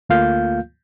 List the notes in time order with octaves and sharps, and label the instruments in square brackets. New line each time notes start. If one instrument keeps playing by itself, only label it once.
[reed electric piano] D2 A3 A#3 F4 F5 G6